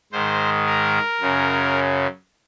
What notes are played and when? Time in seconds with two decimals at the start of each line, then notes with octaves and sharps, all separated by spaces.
0.12 G#2 D#3 C5
0.66 A#4
1.20 F#2 C#3